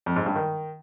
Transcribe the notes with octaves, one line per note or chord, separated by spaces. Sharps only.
F2
G#2
G2
D#3